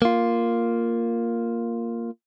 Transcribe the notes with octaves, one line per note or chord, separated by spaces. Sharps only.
A#3 F4